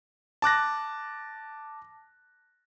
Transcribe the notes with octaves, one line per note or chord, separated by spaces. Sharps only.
A5 D6 F#6 A#6